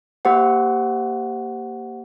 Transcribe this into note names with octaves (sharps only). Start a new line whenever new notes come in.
A#3 G4 C5 F#5